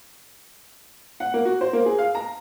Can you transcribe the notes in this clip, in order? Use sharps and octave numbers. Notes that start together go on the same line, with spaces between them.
F#5
A#3
F#4
C5
A#3
G#4
F5
A#5